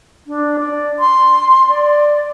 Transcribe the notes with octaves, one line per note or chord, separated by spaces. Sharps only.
D4
D5
C6
D5